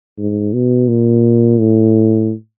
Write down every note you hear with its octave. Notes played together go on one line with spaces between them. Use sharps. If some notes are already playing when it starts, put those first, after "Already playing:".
G#2
B2
A#2
A2